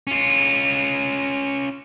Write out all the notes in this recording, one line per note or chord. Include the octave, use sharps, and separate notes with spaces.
C#4 F4